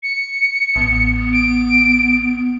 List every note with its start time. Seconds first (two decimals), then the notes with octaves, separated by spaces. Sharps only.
0.03 C#7
0.76 A1 B3
1.33 D7